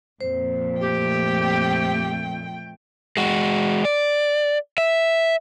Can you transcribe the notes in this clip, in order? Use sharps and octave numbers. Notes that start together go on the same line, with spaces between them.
F2 A#2 C5
A3 G4 G5
G#3 F#4
D5
E5